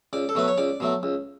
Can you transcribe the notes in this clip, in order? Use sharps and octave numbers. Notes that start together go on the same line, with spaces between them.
C#2 D5
A4
B2 F#3 A3 B4
C#5
C#2 D5
B2 F#3 A3
C#2